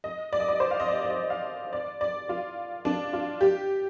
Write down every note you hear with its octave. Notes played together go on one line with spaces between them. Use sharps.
D#5
D5
D#5
D5
C5
F5
D#5
D5
D5
D#5
F5
D5
D5
F4
D4
F4
G4